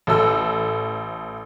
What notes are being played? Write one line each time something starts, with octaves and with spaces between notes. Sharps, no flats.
A1 A4 E6